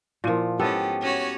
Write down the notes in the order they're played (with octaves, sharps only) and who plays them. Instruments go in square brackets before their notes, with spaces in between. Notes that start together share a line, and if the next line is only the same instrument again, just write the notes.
[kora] A#2 F3 [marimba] A#3 E4 A#4
[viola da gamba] G#2 F3 C#4 [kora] B3 A4 [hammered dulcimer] G4
[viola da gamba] C#4 F#4 C#5